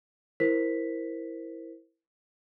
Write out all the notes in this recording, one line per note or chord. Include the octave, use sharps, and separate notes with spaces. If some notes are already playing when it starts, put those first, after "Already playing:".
E4 A#4 C5 B6